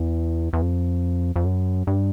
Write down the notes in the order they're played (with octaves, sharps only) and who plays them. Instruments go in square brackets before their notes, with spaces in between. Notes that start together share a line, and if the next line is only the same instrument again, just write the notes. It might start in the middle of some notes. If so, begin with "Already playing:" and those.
Already playing: [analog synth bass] E2
E2
F2
F2
F#2
G2